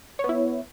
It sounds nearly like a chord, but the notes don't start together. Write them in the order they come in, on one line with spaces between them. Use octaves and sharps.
C#5 B3 E4